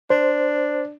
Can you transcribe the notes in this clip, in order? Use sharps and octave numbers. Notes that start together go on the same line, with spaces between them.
D4 C5